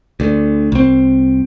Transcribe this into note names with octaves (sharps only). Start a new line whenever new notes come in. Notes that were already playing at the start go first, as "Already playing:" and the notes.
D2 D3
C2 C4